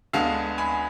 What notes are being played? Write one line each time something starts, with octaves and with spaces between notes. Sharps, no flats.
D2 D3 G#3 B3 F5 A5
G#5 B5